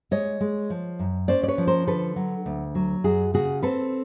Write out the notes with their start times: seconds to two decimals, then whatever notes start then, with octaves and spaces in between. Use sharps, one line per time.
0.11 G#3 C#5 D#5
0.41 G#3
0.70 F3
0.99 F#2
1.28 C#4 C5 D5
1.43 D5
1.48 B4 C#5
1.58 F3
1.67 A#4 C5
1.87 D3 A4 B4
2.16 F#3
2.46 D2
2.75 F#3
3.04 F#2 F#4 G#4
3.34 C#3 F#4 G#4
3.63 C4 A4 B4